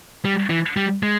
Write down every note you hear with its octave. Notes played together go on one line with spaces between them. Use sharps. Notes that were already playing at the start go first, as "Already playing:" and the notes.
G3
E3
G3
G#3